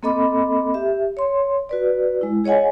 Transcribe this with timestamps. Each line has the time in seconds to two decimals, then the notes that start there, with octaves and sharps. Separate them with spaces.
0.03 A#3 C4 A4 D#5 B5 D6
0.74 G4 E5
1.17 C#5 C6
1.69 F#4 B4 D5
2.21 G#3 E4
2.44 G#4 C#5 D#5 F#5 G#5